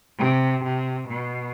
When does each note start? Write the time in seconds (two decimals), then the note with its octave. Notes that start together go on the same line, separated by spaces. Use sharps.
0.18 C3
0.63 C3
1.09 B2